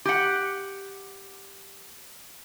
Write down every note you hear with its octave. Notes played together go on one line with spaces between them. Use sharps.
G4 F#5